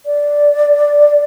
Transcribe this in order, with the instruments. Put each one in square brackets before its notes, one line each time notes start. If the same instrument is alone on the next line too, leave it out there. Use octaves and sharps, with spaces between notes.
[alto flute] D5